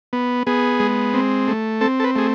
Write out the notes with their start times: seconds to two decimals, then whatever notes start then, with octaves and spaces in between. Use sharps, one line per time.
0.13 B3
0.47 B3 G#4
0.80 G#3
1.14 C4
1.48 A3
1.81 C4 A4
2.00 A4
2.04 B4
2.16 A3 G#4